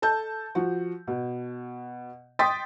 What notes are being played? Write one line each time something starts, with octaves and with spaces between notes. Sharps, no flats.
A4 A5 G6
F3 F#4
B2
G5 C6 D#6 A6 B6